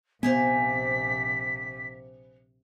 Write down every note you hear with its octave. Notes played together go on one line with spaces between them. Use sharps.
A#1 C3 B3 C5 F5 G#5 B6